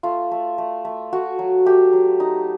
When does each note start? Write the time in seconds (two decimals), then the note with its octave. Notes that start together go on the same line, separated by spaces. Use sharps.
0.03 A3 F4
0.32 A3
0.58 A3
0.85 A3
1.13 A3 F#4
1.39 F#3
1.66 A3 G4
1.93 F#3
2.20 D#4